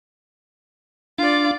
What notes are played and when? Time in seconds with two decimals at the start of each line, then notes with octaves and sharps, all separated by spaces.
1.18 D4 F4 D5